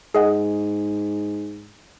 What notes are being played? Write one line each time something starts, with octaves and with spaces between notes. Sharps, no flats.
G#2 G#4 D#5 F#5